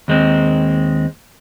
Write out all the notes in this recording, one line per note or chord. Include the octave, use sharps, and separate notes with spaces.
D#2 G#3 C4